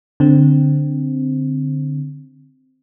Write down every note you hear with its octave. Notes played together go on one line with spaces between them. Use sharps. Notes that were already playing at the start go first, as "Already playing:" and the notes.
D3 C4